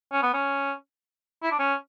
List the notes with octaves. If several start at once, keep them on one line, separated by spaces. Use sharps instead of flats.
C#4
B3
C#4
E4
D4
C#4